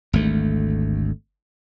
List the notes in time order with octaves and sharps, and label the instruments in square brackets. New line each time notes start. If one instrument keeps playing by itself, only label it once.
[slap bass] G#1 D2 A3